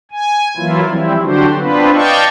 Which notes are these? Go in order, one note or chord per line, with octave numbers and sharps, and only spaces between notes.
G#5
E3 F#3 A#3 E4 F4
E3 F3 G3 C4 E4
D3 F#3 D4 F#4 G4 C5
B3 C4 D4 F4 B4
D5 D#5 F5 G5 A5 C#6